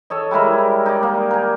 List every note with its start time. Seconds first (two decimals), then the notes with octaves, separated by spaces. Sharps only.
0.10 A4 C#5 D#5
0.31 G3 G#3 E4 A#4
0.86 D#4 D5
1.03 A#3
1.31 A#4 G#5